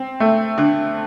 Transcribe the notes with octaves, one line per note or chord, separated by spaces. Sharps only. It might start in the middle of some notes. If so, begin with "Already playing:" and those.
Already playing: C4
A3
D3